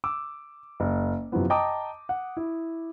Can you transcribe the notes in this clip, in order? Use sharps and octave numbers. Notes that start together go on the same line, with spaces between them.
D6 E6
F#1
F#2 C3 E3 F3 B3
D#5 G5 A5 A#5 D6 D#6
F#5
E4